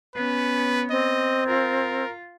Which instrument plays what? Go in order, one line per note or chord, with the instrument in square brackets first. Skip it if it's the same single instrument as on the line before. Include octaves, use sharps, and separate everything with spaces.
[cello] B3 C#4 [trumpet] B4
[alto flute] C4 [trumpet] D#5
[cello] F4 [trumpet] A#4